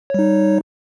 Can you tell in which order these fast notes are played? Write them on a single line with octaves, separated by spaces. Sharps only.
C#5 G3 D#4